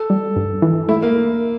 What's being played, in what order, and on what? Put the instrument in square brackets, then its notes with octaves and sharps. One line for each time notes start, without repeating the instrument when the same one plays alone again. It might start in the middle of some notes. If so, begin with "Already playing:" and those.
Already playing: [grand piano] A4
[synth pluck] G3
G2
E3
[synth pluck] A3 [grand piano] E4
[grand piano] A#3